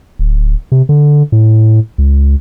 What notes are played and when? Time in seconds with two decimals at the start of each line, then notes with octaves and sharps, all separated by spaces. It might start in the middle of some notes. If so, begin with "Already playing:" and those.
0.19 D1
0.72 C3
0.89 D3
1.32 A2
1.98 C#2